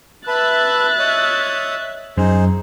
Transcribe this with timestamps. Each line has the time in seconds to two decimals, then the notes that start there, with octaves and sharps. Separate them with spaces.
0.27 B4 E5 A5 B5 F#6 A6
0.99 C#5 D#5 D#6
2.18 F#2 D#4 G#4 C5